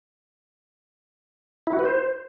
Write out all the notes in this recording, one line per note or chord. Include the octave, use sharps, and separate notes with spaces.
E4
F#4
B4
C5